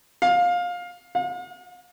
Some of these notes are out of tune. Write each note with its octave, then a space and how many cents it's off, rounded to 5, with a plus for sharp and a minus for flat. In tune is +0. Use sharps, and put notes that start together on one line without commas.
F5 +20
F5 +45